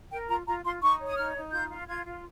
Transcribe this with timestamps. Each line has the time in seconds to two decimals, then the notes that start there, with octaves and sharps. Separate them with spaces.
0.11 A#4 G5
0.29 F4 A#5
0.46 F4 A#5
0.64 F4 C6
0.82 D#4 C#6
0.99 C#5
1.07 D#6
1.17 D#4 F6
1.35 D#4
1.52 F4 G6
1.70 F4
1.88 F4 G#6
2.05 F4